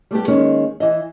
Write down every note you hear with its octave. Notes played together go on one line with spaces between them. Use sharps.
G3 A3 B3 G4
D#3 G#3 A#3 C#4 D#4
E3 E4 D#5